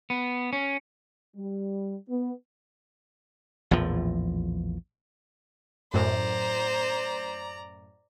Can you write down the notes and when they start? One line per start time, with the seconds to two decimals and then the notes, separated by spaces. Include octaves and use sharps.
0.10 B3
0.53 C#4
1.36 G3
2.09 B3
3.71 A#1 E2 A2 F3
5.94 F#2 A2 C5 D5 A#5